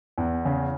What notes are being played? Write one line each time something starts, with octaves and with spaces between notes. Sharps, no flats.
E2
C#3